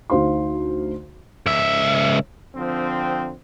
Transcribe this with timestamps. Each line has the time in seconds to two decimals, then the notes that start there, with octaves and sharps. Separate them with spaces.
0.10 D2 D#4 C5 F5 C6
1.46 C#2 E5
2.55 D3 F3 C4